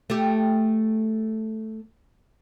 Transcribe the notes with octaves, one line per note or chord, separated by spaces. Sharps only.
A3 G4